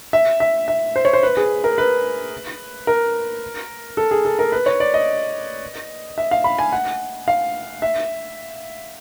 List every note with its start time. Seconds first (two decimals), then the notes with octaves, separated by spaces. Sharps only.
0.13 E5
0.40 E5
0.68 E5
0.96 C5
1.05 C#5
1.13 C5
1.23 B4
1.37 G#4
1.64 A#4
1.78 B4
2.87 A#4
3.97 A4
4.11 G#4
4.25 A4
4.39 A#4
4.52 B4
4.66 C#5
4.80 D5
4.94 D#5
6.18 E5
6.31 F5
6.44 B5
6.59 G#5
6.72 F#5
7.28 F5
7.82 E5